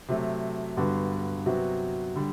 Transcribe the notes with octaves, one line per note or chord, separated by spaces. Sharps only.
C3 F#3 A3
G2 D3 G3 B3 F#4
C3 F#3 B3 F#4
D3 G3